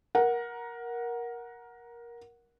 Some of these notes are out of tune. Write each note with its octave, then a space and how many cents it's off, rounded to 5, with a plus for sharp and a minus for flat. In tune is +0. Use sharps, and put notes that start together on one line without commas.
A#4 +15 F#5 -5